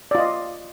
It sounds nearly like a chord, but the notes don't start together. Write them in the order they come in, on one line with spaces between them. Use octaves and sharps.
D5 F4 D#5